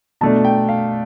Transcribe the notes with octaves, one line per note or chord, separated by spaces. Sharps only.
B2 A3 D4 A5
G5
F5